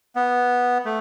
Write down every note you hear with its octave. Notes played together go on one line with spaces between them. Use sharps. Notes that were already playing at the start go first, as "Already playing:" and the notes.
B3
A3